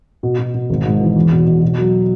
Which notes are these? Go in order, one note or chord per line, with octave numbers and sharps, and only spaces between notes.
B2
B2
B2
G#1
G#2
E3
E2
B2
B2
B2
F#3